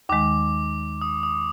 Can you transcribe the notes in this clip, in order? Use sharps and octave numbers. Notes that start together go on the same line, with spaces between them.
D#2 D#3 G#3 D6
D#6
D#6